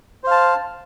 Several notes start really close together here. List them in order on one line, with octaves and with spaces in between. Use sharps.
C5 F5 A5